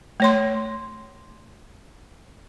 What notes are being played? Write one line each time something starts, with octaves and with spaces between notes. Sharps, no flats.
A3 C#5 C6